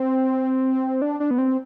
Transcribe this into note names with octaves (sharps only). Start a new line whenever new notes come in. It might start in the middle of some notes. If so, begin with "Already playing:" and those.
Already playing: C4
D4
D4
B3
C4